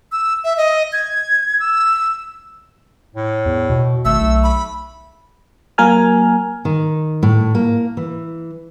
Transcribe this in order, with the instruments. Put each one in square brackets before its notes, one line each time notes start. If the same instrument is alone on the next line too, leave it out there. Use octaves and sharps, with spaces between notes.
[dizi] E6
E5
D#5
G#6
E6
[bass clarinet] A2
[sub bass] E2
B2
[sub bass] G#1 [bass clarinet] A3 [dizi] E6
[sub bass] B1
[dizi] B5
[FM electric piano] F#3 A#3 A#4 G#5 F6
[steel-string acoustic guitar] D#3
A2
A#3
E3